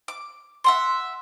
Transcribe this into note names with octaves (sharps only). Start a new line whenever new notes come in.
D6
E5 F#5 C6